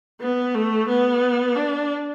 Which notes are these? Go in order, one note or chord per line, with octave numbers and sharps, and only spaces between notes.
B3
A3
B3
D4